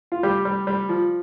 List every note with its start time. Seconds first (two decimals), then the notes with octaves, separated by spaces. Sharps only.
0.12 F4
0.23 G3 G4
0.45 G3
0.67 G3
0.89 F3